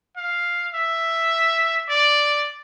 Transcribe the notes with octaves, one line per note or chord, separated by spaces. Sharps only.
F5
E5
D5